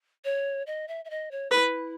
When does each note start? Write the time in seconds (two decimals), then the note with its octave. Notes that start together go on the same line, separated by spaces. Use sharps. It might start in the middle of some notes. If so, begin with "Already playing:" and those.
0.25 C#5
0.67 D#5
0.88 E5
1.05 E5
1.10 D#5
1.31 C#5
1.51 E4 B4